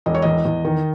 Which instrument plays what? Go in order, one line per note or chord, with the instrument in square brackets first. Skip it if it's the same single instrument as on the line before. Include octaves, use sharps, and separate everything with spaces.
[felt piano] E1 D#5
C#5
E2 D#5
E2
D#3